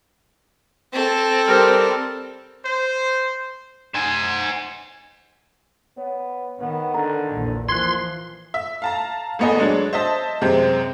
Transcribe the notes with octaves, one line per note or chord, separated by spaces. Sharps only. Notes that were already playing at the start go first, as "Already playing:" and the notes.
C4 A4
G3 A#4 C5
C5
C5 G#5
B3 C#5
D#3 B3
D3 A#5
A#1 E2
A#2 E3 F3 C6 F#6 G#6
E5
F5 A5 A#5
G#1 G#2 B3 A4 D#5 G#5
F#3 G#3 D4
C5 D#5 E5 A5
F#2 C3 G#3 C4